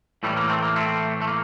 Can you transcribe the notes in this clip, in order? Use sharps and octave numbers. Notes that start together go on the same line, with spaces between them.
A2 E3 G3 A3
A#3
A3 C4
A#3
A3 C4
A3
A#3